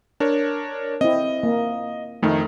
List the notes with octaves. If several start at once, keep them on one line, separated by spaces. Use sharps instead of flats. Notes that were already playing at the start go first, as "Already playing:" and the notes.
D4 A#4 C#5
C4 E4 D#5
A#3
F2 D#3 A3 D#4